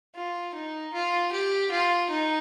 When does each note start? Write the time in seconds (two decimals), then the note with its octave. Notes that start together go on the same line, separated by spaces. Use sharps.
0.15 F4
0.54 D#4
0.94 F4
1.33 G4
1.72 F4
2.10 D#4